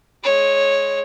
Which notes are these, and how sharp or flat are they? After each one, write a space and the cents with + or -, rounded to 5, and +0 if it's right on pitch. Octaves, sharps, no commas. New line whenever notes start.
G#3 +10 C#5 -10